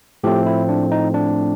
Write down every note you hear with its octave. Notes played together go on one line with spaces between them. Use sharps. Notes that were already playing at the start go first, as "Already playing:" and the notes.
A2 F3 A3 C4 G4
E4
D4
D#4
D4